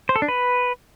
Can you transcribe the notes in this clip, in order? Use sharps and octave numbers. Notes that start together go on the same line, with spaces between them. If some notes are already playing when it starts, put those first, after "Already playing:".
C5
A4
D4
B4